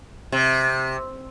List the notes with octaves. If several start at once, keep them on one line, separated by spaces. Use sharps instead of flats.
C3